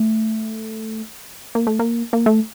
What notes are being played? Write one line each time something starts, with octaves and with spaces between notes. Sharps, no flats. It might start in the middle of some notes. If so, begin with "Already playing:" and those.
Already playing: A3
A#3
A3
A#3
A#3
A3